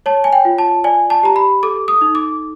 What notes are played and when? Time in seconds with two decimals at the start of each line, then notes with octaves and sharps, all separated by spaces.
0.06 C#5 A5
0.24 G#5
0.33 G5
0.45 F4
0.58 A5
0.84 D5 G#5
1.10 A5
1.23 G4 A#5
1.36 B5
1.63 A4 D6
1.88 D#6
2.01 D#4
2.15 D6